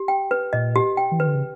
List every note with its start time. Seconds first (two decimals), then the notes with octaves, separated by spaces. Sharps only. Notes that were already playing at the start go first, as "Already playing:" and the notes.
Already playing: G4
0.08 G5
0.31 B4
0.53 A#2 D#5
0.76 G4
0.97 G5
1.12 E3
1.19 D#3 B4
1.27 D3
1.35 C#3